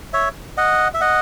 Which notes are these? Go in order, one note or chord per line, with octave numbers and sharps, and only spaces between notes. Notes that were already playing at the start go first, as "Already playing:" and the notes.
C#5 E5
D#5 F#5
E5
D#5 F#5